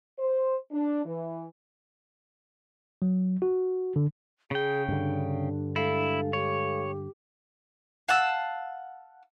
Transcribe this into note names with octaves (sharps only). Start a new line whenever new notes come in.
C5
D4
E3
F#3
F#4
D3
C#3 G#4 G5
G2 D3 D4
G#3 E4 A4 F5
G4 C#5
F5 F#5 A5 E6